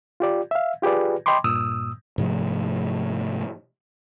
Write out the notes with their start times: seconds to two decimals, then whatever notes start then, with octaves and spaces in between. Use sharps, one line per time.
0.20 F4 G4 D5
0.51 E5 F5
0.82 F4 G4 G#4 B4 D5
1.26 D#5 G5 B5 C6 D6
1.44 G2 A#2 D#6 E6
2.18 G#2 C3 F3 A3